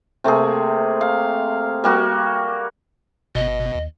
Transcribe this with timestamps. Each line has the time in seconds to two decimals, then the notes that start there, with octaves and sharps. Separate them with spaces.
0.24 C3 A3 A#3 G#4
1.01 F5
1.84 G3 A#3 F#4
3.35 G1 B2 D#5
3.75 D#2